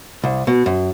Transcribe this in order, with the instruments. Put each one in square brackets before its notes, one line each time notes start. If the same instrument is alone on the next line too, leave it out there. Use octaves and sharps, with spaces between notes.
[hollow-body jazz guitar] C2
B2
F#2